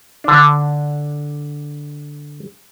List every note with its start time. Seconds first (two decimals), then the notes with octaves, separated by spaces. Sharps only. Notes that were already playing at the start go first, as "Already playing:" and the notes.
0.24 D3 D4